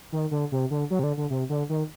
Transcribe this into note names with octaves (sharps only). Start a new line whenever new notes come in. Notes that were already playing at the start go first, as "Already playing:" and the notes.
D#3
D3
C3
D3
F#3
C3
D3
D3
C3
D3
D#3